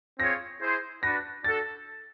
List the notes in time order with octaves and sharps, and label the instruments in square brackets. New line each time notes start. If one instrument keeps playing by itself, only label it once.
[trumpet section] C4 F4 G#4 C#5 [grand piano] A#6
[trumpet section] E4 G#4 C5
[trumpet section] D4 F#4 B4 [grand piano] A#6
[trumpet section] D4 F#4 A4 [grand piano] A6